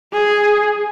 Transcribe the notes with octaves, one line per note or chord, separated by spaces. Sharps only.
G#4